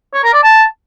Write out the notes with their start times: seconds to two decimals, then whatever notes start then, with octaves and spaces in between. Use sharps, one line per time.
0.14 C#5
0.23 A#4
0.33 D5
0.43 A5